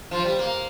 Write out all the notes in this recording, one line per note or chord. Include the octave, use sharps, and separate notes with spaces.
F3
G3
A#3